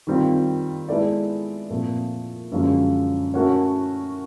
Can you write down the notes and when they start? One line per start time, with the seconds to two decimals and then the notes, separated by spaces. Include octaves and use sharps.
0.07 D#3 G3 C4 F4
0.89 G#3 B3 E4 A4 D5
1.70 A#2 F3 A3 C4
2.52 F#2 D3 F3 G#3 C#4
3.34 A3 C#4 F#4 A#4 C#5